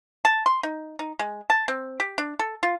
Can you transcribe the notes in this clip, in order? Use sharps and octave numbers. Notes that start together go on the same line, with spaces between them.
A5
C6
D#4
D#4
G#3
A5
C4
G4
D4
A4
F4